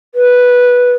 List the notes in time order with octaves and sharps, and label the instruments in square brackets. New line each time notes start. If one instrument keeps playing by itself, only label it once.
[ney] B4